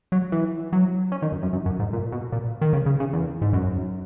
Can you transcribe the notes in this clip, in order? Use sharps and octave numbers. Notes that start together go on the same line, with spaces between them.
F#3
E3
F#3
C#4
D#3
F#2
F#2
F#2
F#2
G#2
A#2
B2
A#2
D#3
C#3
C#3
C#3
E2
G#2
F#2